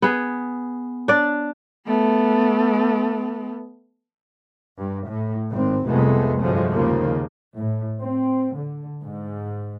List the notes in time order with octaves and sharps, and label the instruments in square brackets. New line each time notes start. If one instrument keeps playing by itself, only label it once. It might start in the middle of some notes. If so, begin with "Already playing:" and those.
[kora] B3 G#4
D4 D5
[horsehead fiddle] A3 B3
[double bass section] G2
A2
G#1 C4
F1 C2 F2 G#3 A3 B3
G2 D3 F3 F#3 G#3 A3
D#2 C#3 F3 A#3
A2
C4
D3
G#2